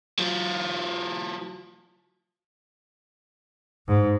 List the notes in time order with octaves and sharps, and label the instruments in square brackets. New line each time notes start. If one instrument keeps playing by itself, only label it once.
[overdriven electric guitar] F#3 F4
[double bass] G#2